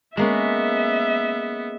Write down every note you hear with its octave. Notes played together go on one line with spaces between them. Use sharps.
G#3 A#3 B3 C#4 E5